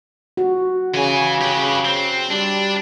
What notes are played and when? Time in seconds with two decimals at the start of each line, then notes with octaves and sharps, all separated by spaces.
0.37 F#4
0.95 C#3 E3 G#5
1.41 G4 B4
1.85 C4
2.30 G3 D4